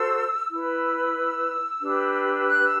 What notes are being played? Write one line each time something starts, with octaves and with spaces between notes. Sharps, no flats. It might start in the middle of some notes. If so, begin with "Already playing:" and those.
Already playing: F#4 A4 C5 E6
E4 B4 E6
D4 G4 B4
F#6
E6